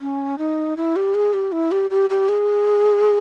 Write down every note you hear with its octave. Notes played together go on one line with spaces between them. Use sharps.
C#4
D#4
E4
G4
G#4
G4
E4
G4
G4
G4
G#4